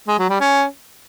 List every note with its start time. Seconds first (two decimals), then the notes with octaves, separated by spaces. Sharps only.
0.08 G#3
0.19 F#3
0.30 G3
0.41 C#4